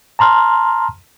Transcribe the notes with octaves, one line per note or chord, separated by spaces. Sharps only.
A5 A#5 C6 F6